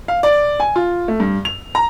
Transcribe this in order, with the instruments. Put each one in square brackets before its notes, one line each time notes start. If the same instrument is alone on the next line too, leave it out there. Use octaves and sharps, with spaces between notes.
[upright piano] F5
D5
G#5
F4
A3
G2
F7
A#5